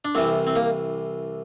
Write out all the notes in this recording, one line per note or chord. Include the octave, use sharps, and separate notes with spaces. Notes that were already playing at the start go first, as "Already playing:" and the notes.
D4
C2 C3 E3 C4
C4
A#3